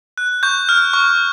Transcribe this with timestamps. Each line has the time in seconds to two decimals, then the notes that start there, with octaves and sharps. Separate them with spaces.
0.18 F#6
0.43 C#6 G6
0.69 F6
0.94 C#6